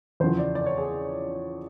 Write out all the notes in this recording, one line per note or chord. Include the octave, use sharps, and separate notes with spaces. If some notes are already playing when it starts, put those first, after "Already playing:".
E2 C#3 F3 C5
D5
D5
C#5
G#4